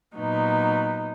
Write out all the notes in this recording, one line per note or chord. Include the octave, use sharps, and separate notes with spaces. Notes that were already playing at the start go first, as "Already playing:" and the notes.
A#2 F#3 B3 D#4